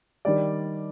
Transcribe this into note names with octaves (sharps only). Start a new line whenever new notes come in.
D#3 G3 D4 G4 D5